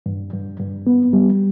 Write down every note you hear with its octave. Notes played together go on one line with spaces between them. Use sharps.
G2
G2
G2
B3
G3